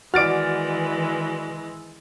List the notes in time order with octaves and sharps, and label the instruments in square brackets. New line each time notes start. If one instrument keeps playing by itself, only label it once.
[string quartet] D#3 E3 G#3 [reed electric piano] F#4 D5 [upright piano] F6 A6 D7